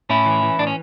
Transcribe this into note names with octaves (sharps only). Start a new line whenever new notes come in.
A2 C#4 E4
E3
E3
A2 D4
C#4